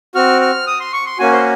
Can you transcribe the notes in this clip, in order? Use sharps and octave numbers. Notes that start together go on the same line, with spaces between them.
C4 F#4 F6
F6
D#6
C6
C#6
C6
A#3 C#4 F#4 G#5
C5